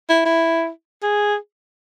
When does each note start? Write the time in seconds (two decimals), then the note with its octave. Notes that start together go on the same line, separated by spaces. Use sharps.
0.09 E4
0.25 E4
1.03 G#4